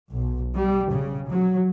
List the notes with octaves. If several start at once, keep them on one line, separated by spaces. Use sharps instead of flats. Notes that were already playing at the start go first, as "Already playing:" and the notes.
B1
G3
C#3
F#3